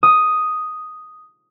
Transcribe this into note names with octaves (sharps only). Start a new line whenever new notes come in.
D#6